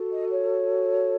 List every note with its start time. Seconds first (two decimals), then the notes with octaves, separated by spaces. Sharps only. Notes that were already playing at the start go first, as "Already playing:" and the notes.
Already playing: F#4 A4
0.10 D#5
0.30 C#5